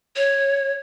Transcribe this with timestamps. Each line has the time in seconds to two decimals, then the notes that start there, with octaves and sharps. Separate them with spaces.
0.16 C#5